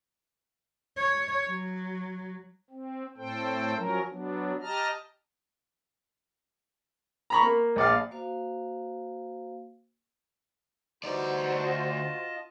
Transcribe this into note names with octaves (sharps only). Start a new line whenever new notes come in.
C#5
F#3
C4
A2 C4 A4 C5 G5
F3 F#3 C#4 A#4
F#3 B3 D4
G4 D#5 A5 A#5 F6
A#5 B5 C#6
A#3
A#1 D5 F5
A#3 F#4 C5 F5
D2 E3 G3 D#4 F#4 C5 D5
F4 D#5 A5